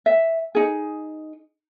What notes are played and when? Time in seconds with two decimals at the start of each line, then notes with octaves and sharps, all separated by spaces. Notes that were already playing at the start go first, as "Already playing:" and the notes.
0.06 E5
0.55 D#4 G#4